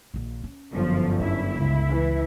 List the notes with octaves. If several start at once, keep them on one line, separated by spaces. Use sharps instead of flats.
A#1 D#3
C#4
G1 F#2 D3 F3
C#4 E4
C#2
E3